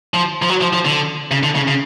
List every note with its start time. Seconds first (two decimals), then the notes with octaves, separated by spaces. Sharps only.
0.14 F3
0.42 F3
0.49 F#3
0.61 F3
0.73 F3
0.85 D3
1.31 C#3
1.43 D3
1.55 C#3
1.68 C#3